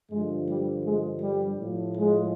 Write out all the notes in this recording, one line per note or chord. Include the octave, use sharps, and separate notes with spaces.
G2 D3 F3 G#3
G3
G#3
G3
A2 F3
G#3